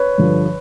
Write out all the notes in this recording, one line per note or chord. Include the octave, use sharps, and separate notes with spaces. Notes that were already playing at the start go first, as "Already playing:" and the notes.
Already playing: B4 C#5
G2 D3 F3